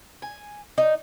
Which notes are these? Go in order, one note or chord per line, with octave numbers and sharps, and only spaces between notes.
G#5
D#4